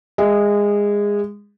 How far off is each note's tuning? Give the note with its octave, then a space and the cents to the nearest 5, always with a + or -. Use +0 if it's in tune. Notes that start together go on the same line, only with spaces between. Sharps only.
G#3 -20 E5 +0